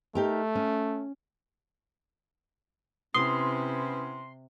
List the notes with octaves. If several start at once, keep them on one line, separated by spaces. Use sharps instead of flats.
A3 D#4 G4 A#4
C#4
C3 B3 C#4 E4 C6 D#6